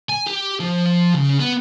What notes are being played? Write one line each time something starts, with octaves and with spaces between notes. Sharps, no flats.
G#5
G4
F3
C#3
B3